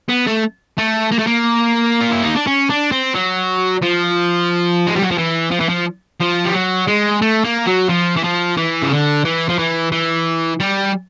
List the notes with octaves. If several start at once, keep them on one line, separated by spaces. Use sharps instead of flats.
B3
A3
A3
A#3
A3
A#3
F4
E4
D#4
D4
C#4
D4
C4
F#3
F3
G#3
G3
F#3
F3
E3
F3
E3
F3
F3
G3
F#3
G#3
A3
A#3
F#3
F3
E3
F3
E3
C#3
D3
E3
F3
E3
E3
G3